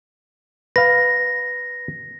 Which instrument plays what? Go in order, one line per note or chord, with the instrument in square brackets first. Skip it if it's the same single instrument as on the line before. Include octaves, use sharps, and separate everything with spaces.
[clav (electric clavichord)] B4 F5 [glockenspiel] A#6